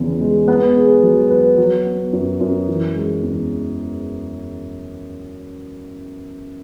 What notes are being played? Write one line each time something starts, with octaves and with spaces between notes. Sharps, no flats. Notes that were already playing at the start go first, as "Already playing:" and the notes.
Already playing: E2 C#3 E3
G#3
B3
G#4
F#3
B4
F#3
B3
F#2
F#2
E3
G#3
E2